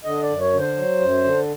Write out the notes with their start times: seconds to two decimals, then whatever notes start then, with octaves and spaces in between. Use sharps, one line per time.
0.04 D3 D#5
0.23 D5
0.29 F#2
0.41 C#5
0.53 D3
0.59 C5
0.76 F#3
1.01 F#2
1.24 D3